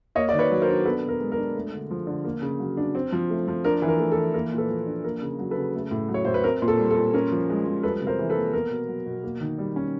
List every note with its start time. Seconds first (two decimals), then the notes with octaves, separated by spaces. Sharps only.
0.15 A#3 C#5 D#5
0.29 D#3 D5
0.39 B4 C#5
0.51 F#3
0.62 A#4 C5
0.68 D4
0.85 B3 A4 B4
1.03 B2
1.08 A#4
1.20 G#3
1.32 A#4
1.38 D4
1.55 A3
1.73 D3
1.91 F3
2.07 D3
2.24 A#3
2.42 C#3
2.60 F#3
2.77 D4
2.95 C4
3.12 F3
3.30 A3
3.48 F3
3.64 D4 A#4
3.82 E3
3.88 A#4
3.99 A3
4.12 A4
4.17 E3
4.34 A#3 A#4
4.52 A#2
4.58 A4 B4
4.69 F3
4.86 D4
5.04 A#3 A#4
5.22 C#3
5.39 F#3
5.51 A4 B4
5.57 C#3
5.75 A3
5.91 A2
6.09 F#3
6.14 C#5
6.25 A2 C5
6.34 B4
6.44 C4 A#4
6.62 A#2
6.68 A4
6.79 G3
6.91 A4
6.96 A#2
7.14 C#4 A#4
7.32 F3
7.49 G#3
7.66 F3
7.83 G3 A4 B4
8.02 C3
8.07 A#4 C5
8.19 E3
8.30 A4 B4
8.36 A#3
8.53 B3 A#4
8.70 B2
8.88 F#3
9.06 B2
9.24 A#3
9.41 D#3
9.58 G3
9.76 C#4